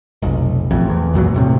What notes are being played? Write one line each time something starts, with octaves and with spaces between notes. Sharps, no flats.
F1 B1
A1 F2
E2
C#2 F#2 A#2 F#3
D#1 A2 C3